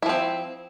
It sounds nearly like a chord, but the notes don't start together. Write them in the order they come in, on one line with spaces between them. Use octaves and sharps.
E4 F3 C4